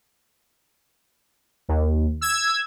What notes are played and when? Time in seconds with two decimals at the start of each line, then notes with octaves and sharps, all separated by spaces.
1.69 D#2
2.21 E6 G#6